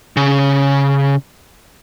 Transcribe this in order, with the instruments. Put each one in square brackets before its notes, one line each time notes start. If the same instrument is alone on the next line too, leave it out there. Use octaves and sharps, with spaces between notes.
[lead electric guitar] C#3